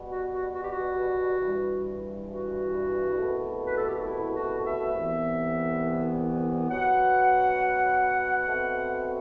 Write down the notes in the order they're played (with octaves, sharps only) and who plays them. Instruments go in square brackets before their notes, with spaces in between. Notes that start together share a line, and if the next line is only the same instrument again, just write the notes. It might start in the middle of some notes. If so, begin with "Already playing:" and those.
Already playing: [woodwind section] B2 G3 B3
F#4
F#4
F#4
G4
F#4
G2 E3 G3
F#4
C2 B2 A3
B4
A4
G4
F#4
E4
F#4
E5
C2 C3 E3 B3
B2 F#3 B3 F#5
B2 A3 C4